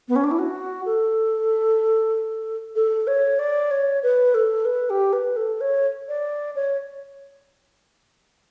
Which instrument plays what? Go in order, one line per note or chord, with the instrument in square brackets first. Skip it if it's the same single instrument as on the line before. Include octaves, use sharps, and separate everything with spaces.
[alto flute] B3
C#4
D4
E4
F#4
A4
A4
C#5
D5
C#5
B4
A4
B4
G4
B4
A4
C#5
D5
C#5